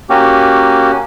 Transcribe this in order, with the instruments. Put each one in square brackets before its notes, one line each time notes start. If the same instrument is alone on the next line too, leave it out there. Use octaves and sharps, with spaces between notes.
[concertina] A#3 C#4 F#4 G4